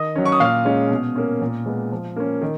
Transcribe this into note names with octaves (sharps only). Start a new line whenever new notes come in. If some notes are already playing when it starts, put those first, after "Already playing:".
Already playing: D#3 D#5 D#6
F#3 C#4
C#6
D#6
A#2 F5 F6
G#3 C#4
B2
A#3 C#4
A#2
G#3 B3
F3
A#3 C#4
D#3